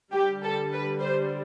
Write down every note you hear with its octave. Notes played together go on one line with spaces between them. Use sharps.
D3 G3 G4
A4
B4
C5